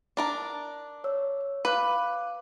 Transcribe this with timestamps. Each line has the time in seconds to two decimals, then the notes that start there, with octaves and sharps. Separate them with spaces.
0.17 D4 A#4 A5
1.04 C#5 E6
1.65 B4 F5 D6 F#6